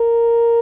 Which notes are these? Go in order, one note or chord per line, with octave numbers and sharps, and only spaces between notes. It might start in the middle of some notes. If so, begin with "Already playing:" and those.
Already playing: A#4